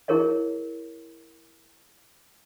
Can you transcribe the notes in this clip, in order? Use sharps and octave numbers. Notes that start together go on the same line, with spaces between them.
E4 G#4 A#4 C#5 D#5